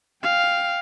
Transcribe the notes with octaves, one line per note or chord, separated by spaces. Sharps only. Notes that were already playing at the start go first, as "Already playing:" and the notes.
F5 G5